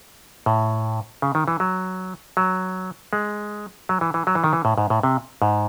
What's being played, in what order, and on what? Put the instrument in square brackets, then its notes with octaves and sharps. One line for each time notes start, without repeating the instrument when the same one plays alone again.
[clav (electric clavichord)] A2
C#3
D#3
E3
F#3
F#3
G#3
F#3
E3
E3
F#3
E3
D#3
E3
A2
G#2
A2
C3
G#2